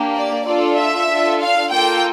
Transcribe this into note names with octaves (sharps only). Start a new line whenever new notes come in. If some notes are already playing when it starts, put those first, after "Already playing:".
Already playing: A#3 D4 G4
D5
D4 F4 A4 D5
E5
D4 F4 A4
F5
A#3 F4 A4 G5